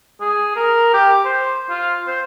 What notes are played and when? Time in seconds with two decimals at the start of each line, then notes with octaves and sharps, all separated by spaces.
0.21 G#4
0.56 A#4
0.93 G4
1.25 C5
1.70 F4
2.07 C5